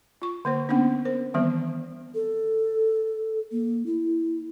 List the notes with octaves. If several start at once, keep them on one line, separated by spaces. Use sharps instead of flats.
F4 C#6
D3 A#3 C5
A#3 B3 C#4 D4
A#4 C5
D#3 E3 G3 B3 C4
A4
A#3
E4